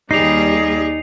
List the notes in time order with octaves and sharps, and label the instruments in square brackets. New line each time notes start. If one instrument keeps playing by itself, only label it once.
[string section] D#2 G3 [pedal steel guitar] D#4 [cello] G#4 D5 [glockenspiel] C7 F7